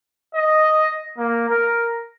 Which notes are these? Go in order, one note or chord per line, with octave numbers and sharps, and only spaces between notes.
D#5
A#3
A#4